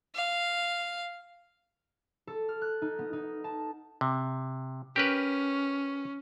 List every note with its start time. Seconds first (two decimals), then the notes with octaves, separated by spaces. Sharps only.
0.15 F5
2.27 A4
2.49 F6
2.62 F#6
2.82 D#4
2.99 B3
3.13 D#4
3.44 A5
4.01 C3
4.96 C#4 G4 A#4 B4